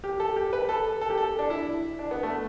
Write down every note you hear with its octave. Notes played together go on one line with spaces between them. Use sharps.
G4
A4
G4
B4
A4
A4
G4
A4
D4
E4
D4
B3
A3